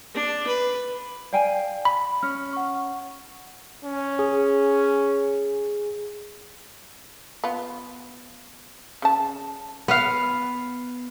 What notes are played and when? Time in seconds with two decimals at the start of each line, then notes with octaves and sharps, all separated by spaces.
0.15 D4
0.47 B4
1.33 D5 F5 G5 G#5
1.85 B5
2.23 C#4 F6
2.53 F#5 C#6
3.85 C#4
4.19 G#4
7.44 B3 F4
9.02 C#3 A5
9.88 B3 F5